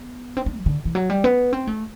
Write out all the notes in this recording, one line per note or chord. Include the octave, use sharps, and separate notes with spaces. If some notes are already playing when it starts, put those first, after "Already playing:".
Already playing: B3
C4
D4
F#3
D3
E3
F#3
G3
B3
C4
A3